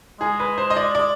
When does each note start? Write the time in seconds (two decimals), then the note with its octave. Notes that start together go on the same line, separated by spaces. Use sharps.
0.20 G#3 G#4
0.40 B4
0.58 C5
0.70 D#5
0.77 D5
0.95 D5